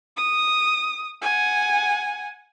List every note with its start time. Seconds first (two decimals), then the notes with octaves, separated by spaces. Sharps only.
0.17 D#6
1.22 F#5 G#5